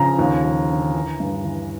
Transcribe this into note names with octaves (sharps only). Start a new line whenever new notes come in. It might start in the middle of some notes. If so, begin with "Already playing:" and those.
Already playing: C#3 F3 A#5
D#2
F3
D3
E3
G2
E3